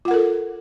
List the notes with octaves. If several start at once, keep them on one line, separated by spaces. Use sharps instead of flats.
F4 A4 A#4 F#5